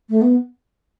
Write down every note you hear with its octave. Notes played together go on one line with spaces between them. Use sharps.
A3
B3